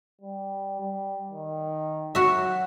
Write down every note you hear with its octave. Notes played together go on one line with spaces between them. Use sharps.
G3
G3
D#3
F#3 F#4 E5